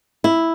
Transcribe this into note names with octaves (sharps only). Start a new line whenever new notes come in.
E4